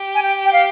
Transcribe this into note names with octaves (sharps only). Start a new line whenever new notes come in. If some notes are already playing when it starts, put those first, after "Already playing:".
Already playing: G4
G#5
G5
G5
F5